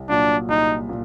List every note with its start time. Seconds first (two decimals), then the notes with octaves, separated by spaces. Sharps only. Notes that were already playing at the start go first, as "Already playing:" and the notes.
Already playing: C2
0.09 A#2 F#3 D4
0.48 C2 D#4
0.89 A#2